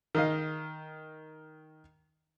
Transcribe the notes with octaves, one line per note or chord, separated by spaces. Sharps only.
D#3 D#5 F5